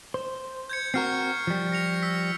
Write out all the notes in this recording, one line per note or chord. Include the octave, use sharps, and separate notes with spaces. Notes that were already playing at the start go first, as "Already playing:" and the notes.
C5
G6 G#6 C#7
C4 F#4 A#4 C#6 F6 C7
F3 G3
A#6 C#7 F7
E6 B6